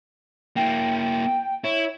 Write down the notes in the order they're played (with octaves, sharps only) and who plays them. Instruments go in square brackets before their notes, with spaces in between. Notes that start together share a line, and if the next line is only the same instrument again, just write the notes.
[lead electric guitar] A#3 E4 [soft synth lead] G5
[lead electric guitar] E4 [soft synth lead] C#5